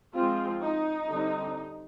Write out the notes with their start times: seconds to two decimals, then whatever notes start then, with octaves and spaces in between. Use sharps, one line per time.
0.15 F3 G#3 C4 F4
0.62 D#4
1.08 D3 G3 C4